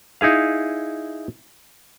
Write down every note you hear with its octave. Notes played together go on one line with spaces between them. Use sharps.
D#4 E4 G#4 F5